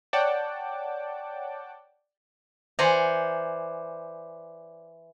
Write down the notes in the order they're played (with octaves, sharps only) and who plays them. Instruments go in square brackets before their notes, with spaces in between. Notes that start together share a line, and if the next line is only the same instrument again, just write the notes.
[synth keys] C#5 D5 F#5 G5 A5 D6
[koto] E3 C5 D5 F#5 G#5 A#5